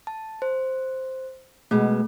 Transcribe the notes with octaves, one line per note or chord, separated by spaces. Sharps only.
A5
C5
B2 G#3 A3